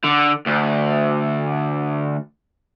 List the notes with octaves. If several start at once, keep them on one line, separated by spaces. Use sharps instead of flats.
D3
D2